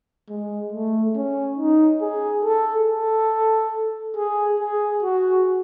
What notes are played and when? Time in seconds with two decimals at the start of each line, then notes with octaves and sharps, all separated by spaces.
0.30 G#3
0.72 A3
1.16 C#4
1.58 D#4
2.01 G#4
2.44 A4
2.88 A4
4.17 G#4
4.60 G#4
5.03 F#4